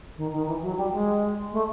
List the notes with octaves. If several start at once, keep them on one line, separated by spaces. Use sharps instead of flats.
D#3
D#3
E3
F#3
G3
G#3
A3